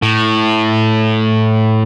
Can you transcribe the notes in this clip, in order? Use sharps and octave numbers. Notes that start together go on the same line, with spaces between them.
A2